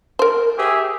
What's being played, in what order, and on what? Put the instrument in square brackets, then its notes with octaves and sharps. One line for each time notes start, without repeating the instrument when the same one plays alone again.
[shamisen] A#4 C5
[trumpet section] G4 G#4 E5